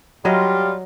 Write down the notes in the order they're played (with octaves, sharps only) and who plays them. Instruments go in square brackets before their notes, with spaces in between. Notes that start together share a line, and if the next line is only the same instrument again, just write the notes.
[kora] F#3 D#5 [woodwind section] G3 F4